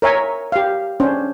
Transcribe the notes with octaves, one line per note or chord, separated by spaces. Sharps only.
A#4 C#5 E5 G#5
G4 F5
C#4 D4 C5